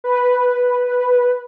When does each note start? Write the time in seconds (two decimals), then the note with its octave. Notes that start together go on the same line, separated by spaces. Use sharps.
0.04 B4